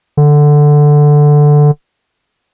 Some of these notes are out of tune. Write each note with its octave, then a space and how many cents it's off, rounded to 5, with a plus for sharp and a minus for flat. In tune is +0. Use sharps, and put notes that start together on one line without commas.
D3 +5